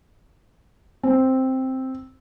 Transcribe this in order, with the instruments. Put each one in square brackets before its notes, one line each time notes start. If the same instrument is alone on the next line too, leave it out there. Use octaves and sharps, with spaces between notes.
[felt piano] C4